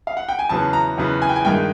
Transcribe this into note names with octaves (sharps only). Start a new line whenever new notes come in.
F5
F#5
G5
G#5
E2 C#3 F#3 B3 A5
A#5
E2 C#3 F#3 B3
G#5
G5
G#5
G2 D#3 G#3 G5